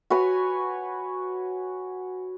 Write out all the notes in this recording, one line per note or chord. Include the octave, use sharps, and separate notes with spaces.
F#4 B4 C#5 G#5